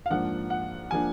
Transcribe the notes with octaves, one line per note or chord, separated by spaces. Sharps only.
F5
G#2 F3 A#3 D4 F#5
F#5
F3 A#3 D4 G#5